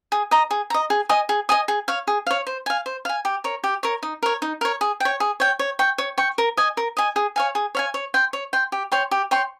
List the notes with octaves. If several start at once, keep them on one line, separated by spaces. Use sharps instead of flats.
G#4
D#5 A#5
G#4
D#5 A#5
G#4
D#5 G#5 D#6
G#4
D#5 G#5 D#6
G#4
C#5 F5
G#4
C#5 F5
C5
F5 G#5
C5
F5 G#5
G4
A#4 C#5
G4
A#4 C#5
D#4
A#4 C#5
D#4
A#4 C#5
G#4
C#5 G5
G#4
C#5 G5
C#5
G5 C#6
C#5
G5 C#6
A#4
D#5 G#5
A#4
D#5 G#5
G#4
C#5 F5 G#5
G#4
C#5 F5 G#5
C#5
G5 C6
C#5
G5 C6
G4
C#5 G5 C6
G4
C#5 G5 C6